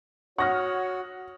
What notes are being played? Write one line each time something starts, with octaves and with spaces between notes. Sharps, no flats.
F#4 C#5 F#5 C#6 D#6 F6 A#6